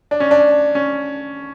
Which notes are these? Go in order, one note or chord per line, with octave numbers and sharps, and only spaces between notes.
D4
C#4
D4
C#4